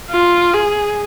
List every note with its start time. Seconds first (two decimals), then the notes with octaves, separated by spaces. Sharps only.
0.10 F4
0.54 G#4